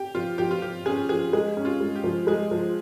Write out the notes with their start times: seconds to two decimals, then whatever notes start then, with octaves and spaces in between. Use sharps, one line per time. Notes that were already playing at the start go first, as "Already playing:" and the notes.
Already playing: G4 G5
0.15 F3 F4
0.38 F3 G4
0.51 F4
0.62 F3 G4
0.86 C#4 G#4
1.09 F3 G#4
1.33 G#3 G#4
1.57 C#4
1.65 F4
1.80 G#3
1.96 G4
2.04 F3
2.27 G#3 G#4
2.51 F3